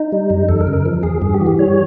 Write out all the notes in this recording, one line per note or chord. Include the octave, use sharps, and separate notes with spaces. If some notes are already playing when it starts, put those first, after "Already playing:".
Already playing: D#4
G3
F#2
E2 A4
A#4
C#3
A#4
F3
E2 G#4
G2 G#4
G4
E3 F#4
G4
G3 C#5